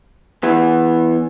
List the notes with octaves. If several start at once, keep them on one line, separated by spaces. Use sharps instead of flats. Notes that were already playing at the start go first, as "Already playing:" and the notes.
E3 B3